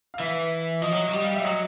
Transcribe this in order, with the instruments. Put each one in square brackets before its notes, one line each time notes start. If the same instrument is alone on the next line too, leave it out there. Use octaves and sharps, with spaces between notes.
[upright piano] F5
[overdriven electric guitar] E3 [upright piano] E5
[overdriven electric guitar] F3 [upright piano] D#5
[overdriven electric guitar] F#3
F#3
[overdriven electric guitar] G3 [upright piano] D#5
[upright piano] F5
E5
[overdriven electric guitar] G3
[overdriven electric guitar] F#3 [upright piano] D#5